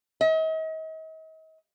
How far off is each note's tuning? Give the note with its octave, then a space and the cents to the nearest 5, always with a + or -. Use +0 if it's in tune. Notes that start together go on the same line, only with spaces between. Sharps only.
D#5 +40